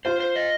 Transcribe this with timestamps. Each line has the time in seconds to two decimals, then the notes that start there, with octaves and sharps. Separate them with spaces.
0.05 F4 C5
0.20 C5
0.36 D#5